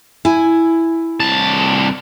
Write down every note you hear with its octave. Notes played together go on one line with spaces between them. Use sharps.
E4 G#5
C2 A5